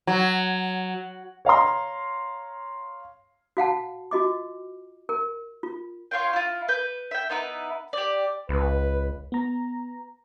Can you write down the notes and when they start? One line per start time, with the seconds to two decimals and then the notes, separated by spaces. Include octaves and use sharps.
0.07 F#3
1.45 C#5 F5 A#5 C6
3.57 F#4 F5 F#5 A5
4.11 F4 F#4 D#5 D6
5.09 A#4
5.63 F4
6.11 F4 C#5 F5 G5
6.33 E4 F4
6.68 B4 G6
7.11 E5 G5
7.30 B3 D#4 E4 B4
7.93 G4 D5
8.49 C#2 B4
9.32 B3 A#5